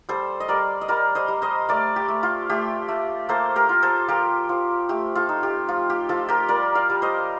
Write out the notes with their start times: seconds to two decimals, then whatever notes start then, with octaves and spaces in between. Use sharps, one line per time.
0.09 G3 A4 C5
0.40 D#5
0.48 G3 A#4 D5
0.81 D#5
0.88 G3 A#4 D5
1.15 C5 D#5
1.28 G3
1.42 C5 D#5
1.69 A3 A#4 D5
1.96 G4
2.08 A3
2.23 F4
2.49 A3 G4
2.88 A3
3.29 A#3 A4 C5
3.56 G4 A#4
3.69 F4
3.83 A4 C5
4.08 F3 G4 A#4
4.49 F3
4.89 A3 G4
5.15 F4 A4
5.29 D#4
5.43 G4
5.68 F3 F4
5.90 G4
6.09 F3 F4 A4
6.28 G4 A#4
6.48 G3 A#4 D5
6.75 D5 F5
6.90 G3
7.02 C5 D#5